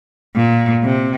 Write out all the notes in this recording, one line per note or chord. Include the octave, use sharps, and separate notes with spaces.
A#2
C3